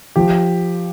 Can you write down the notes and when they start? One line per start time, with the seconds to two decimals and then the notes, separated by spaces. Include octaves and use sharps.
0.16 F3 G4